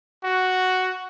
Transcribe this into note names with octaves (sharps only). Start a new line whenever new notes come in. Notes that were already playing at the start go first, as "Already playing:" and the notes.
F#4